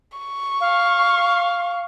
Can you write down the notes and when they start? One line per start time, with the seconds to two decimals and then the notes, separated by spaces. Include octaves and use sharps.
0.18 C#6
0.60 F5